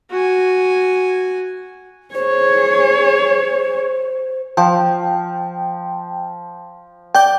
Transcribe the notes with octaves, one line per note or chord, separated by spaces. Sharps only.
F#4 G#5
G#4 C5 C#5
F3 G5
D5 G5 G6